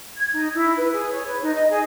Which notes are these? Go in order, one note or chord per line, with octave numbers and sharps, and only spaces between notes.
G#6
D#4
E4
B4
G#4
C#5
B4
D#4
D#5
G#4